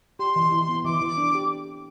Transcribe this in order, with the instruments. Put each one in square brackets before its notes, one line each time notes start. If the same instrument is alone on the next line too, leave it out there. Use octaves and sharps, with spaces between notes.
[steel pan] G4 [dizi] C6
[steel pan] E3
E3
B3
[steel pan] E3 [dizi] D6
[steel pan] E3
D4
G4